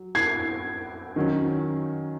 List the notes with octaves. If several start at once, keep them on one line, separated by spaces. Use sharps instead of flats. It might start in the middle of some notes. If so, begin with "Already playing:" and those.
Already playing: F#3
G#6 C7
D#3 F#3 C#4